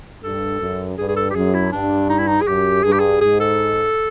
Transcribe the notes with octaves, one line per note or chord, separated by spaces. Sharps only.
G2 A4
F#2
G2 G#4
G#4
A4
G4
F#2 G#4
E4
G2 D4
D#4
E4
D#4
G#4
F#2 G4
G2 G#4
G4
G#4
G#2 G#4
A4